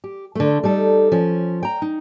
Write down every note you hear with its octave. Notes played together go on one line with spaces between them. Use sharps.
G4
D3 A3
G3 D#4 A4
F3 C#4
G5 A#5
D#4